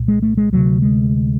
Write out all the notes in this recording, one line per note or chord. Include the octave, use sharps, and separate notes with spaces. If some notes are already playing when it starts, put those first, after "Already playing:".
Already playing: C2 A#2
G#3
A3
G#3
D2 C3 F#3
G#3